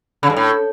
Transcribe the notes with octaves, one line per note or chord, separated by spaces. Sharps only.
C#3
G2
A2